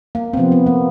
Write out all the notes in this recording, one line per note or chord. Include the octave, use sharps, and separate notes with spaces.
A#3
C4
C3 F3 A#3 B3
B3
A#3